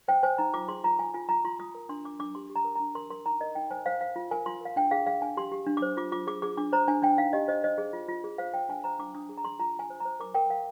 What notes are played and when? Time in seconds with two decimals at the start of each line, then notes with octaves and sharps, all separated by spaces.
0.08 C5 G5
0.23 C5 G#5
0.38 D#4 A#5
0.54 F4 D6
0.68 G#4 C6
0.84 F4 A#5
0.99 F4 G#5
1.14 F4 G#5
1.29 F4 A#5
1.45 F4 C6
1.59 F4 D#6
1.75 A#4
1.89 D4 C6
2.04 D4 D6
2.19 D4 D6
2.35 G4 C6
2.50 G4
2.56 A#5
2.65 A#4
2.76 D4 A#5
2.95 A#4 C6
3.10 A#4 C6
3.26 D#4 A#5
3.40 A#4 D#5
3.55 D#4 G5
3.71 C5 G#5
3.86 C5 F5
4.01 C5 F5
4.16 F4
4.31 A#4 G#5
4.46 F4 C6
4.61 A#4 F5
4.76 D4 G5
4.91 G#4 F5
5.07 G#4 F5
5.21 D4 G#5
5.37 G4 C6
5.52 G4
5.66 D4
5.77 D6
5.82 C5
5.97 F4 D6
6.12 F4 D6
6.27 G#4 D6
6.42 G#4 D6
6.57 D4 D6
6.73 C5 A#5
6.88 D4 G#5
7.02 D4 G5
7.18 D#4 F5
7.33 G4 D#5
7.48 C5 D#5
7.64 C5 D#5
7.78 G#4
7.93 F4
8.08 F4
8.24 G#4
8.38 C5 F5
8.54 C5 G5
8.69 D4 G#5
8.84 C5 A#5
8.99 D4 D6
9.15 D4 D#6
9.29 G#4
9.38 A#5
9.44 G#4 C6
9.59 F4 A#5
9.75 F4 G#5
9.90 C5
10.00 C5 A#5
10.20 A#4 D6
10.35 A#4 G5
10.50 A#4 F5